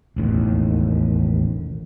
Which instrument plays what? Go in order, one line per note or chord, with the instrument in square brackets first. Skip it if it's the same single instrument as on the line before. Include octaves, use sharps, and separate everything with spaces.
[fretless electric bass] E1 A1 D#2